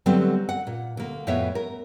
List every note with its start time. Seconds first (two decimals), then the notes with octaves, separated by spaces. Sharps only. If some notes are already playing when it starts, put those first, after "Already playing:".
0.06 D3 F#3 G3 A3 B3 C4
0.49 F#5
0.67 A#2
0.97 D2 A#3
1.27 F2 A2 B3 C#5 E5
1.55 A#4